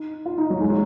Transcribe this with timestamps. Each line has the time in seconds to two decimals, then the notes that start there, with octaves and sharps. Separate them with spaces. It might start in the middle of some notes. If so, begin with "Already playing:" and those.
Already playing: D#4
0.25 F4
0.38 D#4
0.50 F#3
0.61 G#3
0.69 F#3